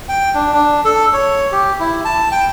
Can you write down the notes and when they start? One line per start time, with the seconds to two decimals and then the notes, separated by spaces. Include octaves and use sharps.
0.09 G5
0.34 D4
0.53 D4
0.85 A4
1.13 C#5
1.52 G4
1.80 E4
2.05 A5
2.32 G5